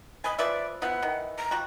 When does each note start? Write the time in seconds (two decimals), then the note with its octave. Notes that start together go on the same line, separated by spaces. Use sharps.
0.24 D#5 G#5 B5
0.39 F3 B4 D5 E5
0.82 F3 B3 E4 F#5
1.03 D#3 E3
1.38 A#5
1.51 F3 G3 F#4